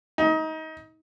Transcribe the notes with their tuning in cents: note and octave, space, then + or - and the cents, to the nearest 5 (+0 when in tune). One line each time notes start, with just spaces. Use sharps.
D#4 +25